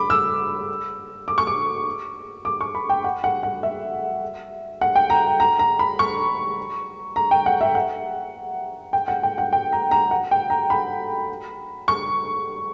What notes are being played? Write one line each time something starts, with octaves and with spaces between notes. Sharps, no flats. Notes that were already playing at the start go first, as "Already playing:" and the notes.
Already playing: B5 D6
E6
D6
C#6
D6
D6
C#6
B5
G5
F#5
F#5
F#5
E5
F#5
G5
A#5
A#5
A#5
B5
C#6
A#5
G5
F#5
E5
F#5
G5
F#5
G5
F#5
G5
A#5
A#5
F#5
G5
A#5
B5
C#6